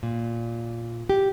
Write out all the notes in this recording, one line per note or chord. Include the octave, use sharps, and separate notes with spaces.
A#2
G4